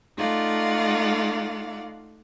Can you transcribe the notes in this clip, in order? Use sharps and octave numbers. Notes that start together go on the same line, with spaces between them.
A3 D#4 F4 D5 F5 F#5